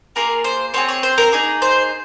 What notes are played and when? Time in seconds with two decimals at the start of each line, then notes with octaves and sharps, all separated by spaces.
0.16 A#3 F4 G#4 A#4
0.44 C5
0.74 C4 F4 G#4 C#5
0.89 C#5
1.03 C5
1.18 A#4
1.32 A#3 D#4 G#4
1.62 C5